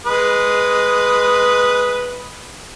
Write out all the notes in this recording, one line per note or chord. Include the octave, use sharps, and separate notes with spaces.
G#3 B4 D#6